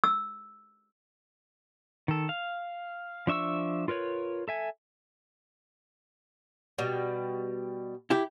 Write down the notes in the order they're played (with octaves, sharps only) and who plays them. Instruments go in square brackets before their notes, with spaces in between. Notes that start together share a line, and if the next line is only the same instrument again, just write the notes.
[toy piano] E6
[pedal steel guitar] D#3 A4
F5
F3 D4 E5 C#6 E6
F4 A#4 B4 C#5
A4 E5 G#5
[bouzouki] B2 G3
[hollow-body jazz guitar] E4 G4